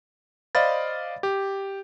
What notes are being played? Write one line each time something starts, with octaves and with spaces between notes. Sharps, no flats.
C5 D5 D#5 F5 B5 A6
G4